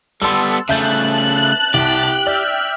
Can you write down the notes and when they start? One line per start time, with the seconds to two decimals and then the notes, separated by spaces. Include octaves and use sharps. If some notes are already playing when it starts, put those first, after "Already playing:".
0.22 G3 B3 A4 C6 E6
0.69 C#3 A3 E5 A5 F#6 G6
1.74 C2 G4
2.26 D5 E5 G5 F6